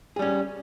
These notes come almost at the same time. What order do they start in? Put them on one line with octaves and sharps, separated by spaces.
G#4 G3 C#4